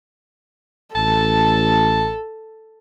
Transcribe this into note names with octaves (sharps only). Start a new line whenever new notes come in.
A1 A4 A5